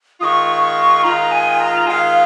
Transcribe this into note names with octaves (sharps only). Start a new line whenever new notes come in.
D#3 G#3 F4 C#6 D#6
C#6
D#3 G#3 F4 A#5
G#5
A#5
D#3 G#3 F4 F5 G#5